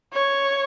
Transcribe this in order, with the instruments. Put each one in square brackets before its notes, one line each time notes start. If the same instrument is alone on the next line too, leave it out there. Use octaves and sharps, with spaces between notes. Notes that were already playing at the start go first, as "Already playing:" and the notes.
[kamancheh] C#5